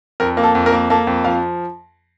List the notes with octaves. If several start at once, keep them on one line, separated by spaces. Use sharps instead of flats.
F2 A#4
A#3
A4
F2
A#4
A#3
A#3 A4
F2
F3 F5